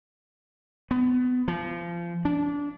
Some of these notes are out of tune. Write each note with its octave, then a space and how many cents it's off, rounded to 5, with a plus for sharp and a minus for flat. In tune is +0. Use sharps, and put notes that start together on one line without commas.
B3 +25
F3 -25
D4 -20